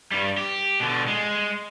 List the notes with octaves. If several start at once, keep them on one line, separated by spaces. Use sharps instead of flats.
G2 G3
G4
B2 D3
G#3